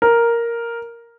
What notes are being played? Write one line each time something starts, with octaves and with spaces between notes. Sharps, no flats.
A#4